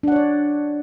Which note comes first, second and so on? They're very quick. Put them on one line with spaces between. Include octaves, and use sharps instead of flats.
D4 F#5 C#5 D5